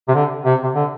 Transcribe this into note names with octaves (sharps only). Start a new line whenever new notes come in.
C3
D3
C3
C3
D3